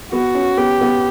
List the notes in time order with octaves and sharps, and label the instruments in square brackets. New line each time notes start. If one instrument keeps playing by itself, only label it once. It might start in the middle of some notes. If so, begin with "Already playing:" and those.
[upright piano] B3 [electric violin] F#4
[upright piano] C#4
[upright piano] B3 [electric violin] G4
[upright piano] B3